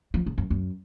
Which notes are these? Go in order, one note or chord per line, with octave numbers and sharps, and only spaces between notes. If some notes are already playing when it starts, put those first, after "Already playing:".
F3
G#2
F#2
F#2